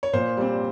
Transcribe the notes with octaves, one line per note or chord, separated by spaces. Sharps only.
C#5
A#2 C5
G3 C4